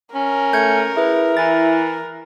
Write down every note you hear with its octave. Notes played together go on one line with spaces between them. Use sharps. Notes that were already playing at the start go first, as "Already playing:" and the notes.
C#4 A#4
A3 G6 G#6 C#7
E4 G#4 B4
E3 A6